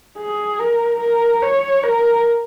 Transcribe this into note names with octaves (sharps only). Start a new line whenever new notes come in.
G#4
A#4
A#4
C#5
A#4